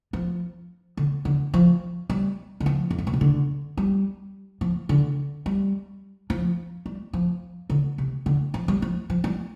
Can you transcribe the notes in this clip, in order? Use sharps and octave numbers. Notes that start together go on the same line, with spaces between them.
F3
D3
D3
F3
G3
D3
F3
F2
G2
A#2
C3
D3
G3
F3
D3
G3
F3
G3
F3
D3
C3
D3
F3
G3
F3
F3
G3